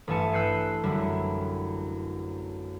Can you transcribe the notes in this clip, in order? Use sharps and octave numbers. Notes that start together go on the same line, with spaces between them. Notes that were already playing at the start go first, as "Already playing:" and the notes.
A1 G2 E3 G#5 A5 C#7
E6 F#6 G6 C7 C#7 D#7
F#2 D3 G3 E4